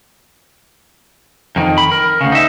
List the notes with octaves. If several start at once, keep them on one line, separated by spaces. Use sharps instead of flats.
F2 D#3
B5
A#4
D2 C#3
D#4 E5